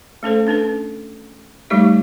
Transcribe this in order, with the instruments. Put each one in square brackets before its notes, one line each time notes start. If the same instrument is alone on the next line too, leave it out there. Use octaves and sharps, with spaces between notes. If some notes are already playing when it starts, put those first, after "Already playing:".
[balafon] A3 C#4 A4 C5
C#4 D4 A4 B4
F3 G3 A3 D#4 G4 E5